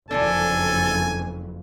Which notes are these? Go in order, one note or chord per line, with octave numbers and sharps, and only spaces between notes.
F#1 F2 D3 E3 D4 A4 G#5